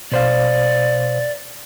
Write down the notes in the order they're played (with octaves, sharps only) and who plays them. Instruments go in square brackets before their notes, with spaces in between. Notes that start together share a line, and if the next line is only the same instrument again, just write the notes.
[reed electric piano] B2 C5 F5 [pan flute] D5